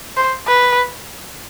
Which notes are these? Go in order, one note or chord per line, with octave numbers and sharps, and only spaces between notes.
C5
B4